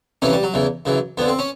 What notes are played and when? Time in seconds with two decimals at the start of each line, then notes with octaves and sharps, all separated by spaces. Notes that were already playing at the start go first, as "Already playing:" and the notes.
0.22 F2 C3 E3 C#4
0.33 G3
0.43 F#3
0.54 E2 C#3 E3
0.85 F#2 C#3 E3
1.18 F2 D3 B3
1.28 C4
1.39 C#4